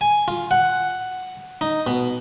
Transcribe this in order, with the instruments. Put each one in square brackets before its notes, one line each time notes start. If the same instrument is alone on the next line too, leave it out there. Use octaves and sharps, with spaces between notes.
[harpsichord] G#5
F4
F#5
D#4
B2